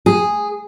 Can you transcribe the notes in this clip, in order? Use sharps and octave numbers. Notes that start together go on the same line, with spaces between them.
G#4